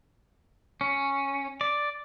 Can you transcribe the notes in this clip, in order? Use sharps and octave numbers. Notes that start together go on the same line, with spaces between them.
C#4
D5